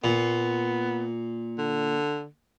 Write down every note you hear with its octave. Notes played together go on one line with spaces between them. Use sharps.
A#2 B3
D3